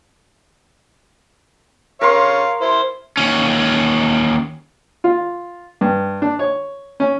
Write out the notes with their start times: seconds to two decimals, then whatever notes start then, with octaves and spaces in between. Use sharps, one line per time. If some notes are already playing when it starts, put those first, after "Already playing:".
2.01 A#4 C#5 F5 C6
2.61 E4 C5
3.17 D#2 C#4
5.04 F4
5.81 G2
6.22 D4
6.39 C#5
7.00 C#4